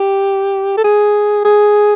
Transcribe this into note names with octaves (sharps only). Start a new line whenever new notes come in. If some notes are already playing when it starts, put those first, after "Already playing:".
Already playing: G4
A4
G#4
G#4